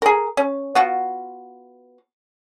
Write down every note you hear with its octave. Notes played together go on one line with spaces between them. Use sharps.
G#4 A#4
C#4
B3 F4 F#4